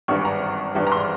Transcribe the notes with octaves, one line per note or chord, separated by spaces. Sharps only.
G#1 G2 E3 C#6
A#5
G#1 G2 E3
A#5
C6